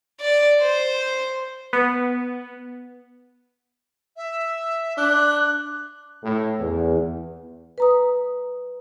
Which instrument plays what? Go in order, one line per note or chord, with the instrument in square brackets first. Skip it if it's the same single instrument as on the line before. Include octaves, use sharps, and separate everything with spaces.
[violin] D5
C5
[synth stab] B3
[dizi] E5
[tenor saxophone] D4 [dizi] F#6
[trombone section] A2
E2
[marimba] B4 A#5 D#6